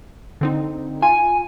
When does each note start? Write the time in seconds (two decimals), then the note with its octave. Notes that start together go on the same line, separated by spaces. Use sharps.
0.41 D3 C4 D#4
1.02 F4 G#5